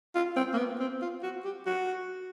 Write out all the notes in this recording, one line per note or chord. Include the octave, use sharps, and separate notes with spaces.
F4
C4
A#3
B3
C4
F4
F#4
G4
F#4